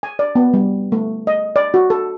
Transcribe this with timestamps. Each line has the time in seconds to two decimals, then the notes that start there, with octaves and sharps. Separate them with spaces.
0.03 G#5
0.19 D5
0.35 B3
0.54 G3
0.92 A3
1.27 D#5
1.56 D5
1.74 F#4
1.90 A4